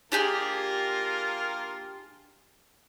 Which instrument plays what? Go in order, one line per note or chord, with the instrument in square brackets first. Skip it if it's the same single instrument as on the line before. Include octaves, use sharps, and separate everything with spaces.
[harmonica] A#3 F4 A#4 [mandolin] D4 G4 G#4